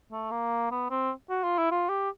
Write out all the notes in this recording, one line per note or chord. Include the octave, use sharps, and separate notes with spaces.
A3
A#3
B3
C4
F#4
F4
E4
F4
G4